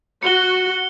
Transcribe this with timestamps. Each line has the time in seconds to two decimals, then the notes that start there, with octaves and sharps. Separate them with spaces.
0.23 F#4 C#7 G7